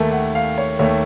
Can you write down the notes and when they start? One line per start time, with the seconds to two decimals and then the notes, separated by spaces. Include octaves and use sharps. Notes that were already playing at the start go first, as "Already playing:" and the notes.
Already playing: D#2 D#3 A3 A5
0.12 F#5
0.35 F5
0.58 C#5
0.79 D#2 D#3 A3 C#5